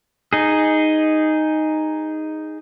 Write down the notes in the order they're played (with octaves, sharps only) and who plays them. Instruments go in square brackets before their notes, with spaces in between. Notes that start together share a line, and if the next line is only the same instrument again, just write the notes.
[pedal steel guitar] D#4 G#4